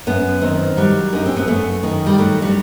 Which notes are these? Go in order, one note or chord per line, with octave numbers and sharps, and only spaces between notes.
F#2 B3
D#3 C4
F#3 G3
F#2 D#4
C4
B3
F#2 A3
D#3
G3
F#3 A3
G3